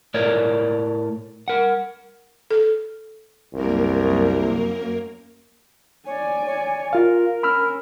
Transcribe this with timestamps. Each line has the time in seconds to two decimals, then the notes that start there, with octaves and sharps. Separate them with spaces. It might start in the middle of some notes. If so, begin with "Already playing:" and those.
0.14 A2 A#4 C#5 D5
1.48 A#4 F#5
2.51 A4
3.54 C2 F#2 A#3 A#4
6.06 C#5 D5 G#5
6.45 C#5
6.93 F4 A#4 F5
7.43 C#4 B5 E6 F6